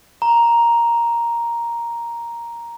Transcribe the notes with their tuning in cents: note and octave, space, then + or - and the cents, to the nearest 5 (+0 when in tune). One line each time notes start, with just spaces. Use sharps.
A#5 +5